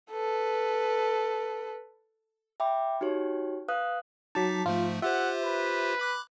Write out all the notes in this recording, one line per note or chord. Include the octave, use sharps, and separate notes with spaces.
A4 B4
E5 G5 B5 D6
D#4 F#4 G4 C#5
B4 F5 D#6 F#6
F#3 D#4 A5 D6 B6
G#2 F3 A3 F4
F4 G4 C5 E5 F#5
B4
B5 D6 F#6